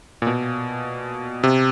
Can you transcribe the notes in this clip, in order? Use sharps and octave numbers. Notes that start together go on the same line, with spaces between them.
A#2
B2
C3